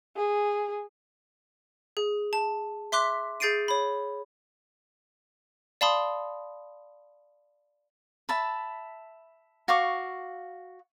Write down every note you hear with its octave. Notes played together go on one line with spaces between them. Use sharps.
G#4
G#4
A5
E5 C6 D6 F#6 B6
G#4 G6 A6 C7 D7 D#7
C#5 B5
D5 F5 A5 B5 C6 D#6
E5 A5 B5
F#4 F5 C#6 D6